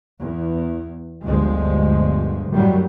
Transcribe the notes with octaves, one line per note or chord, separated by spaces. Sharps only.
E2
G1 D2 F3 G#3
F#2 A2 D#3 F#3 G3